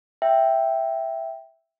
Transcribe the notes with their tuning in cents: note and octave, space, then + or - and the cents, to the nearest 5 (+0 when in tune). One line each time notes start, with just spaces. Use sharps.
E5 +0 G5 +0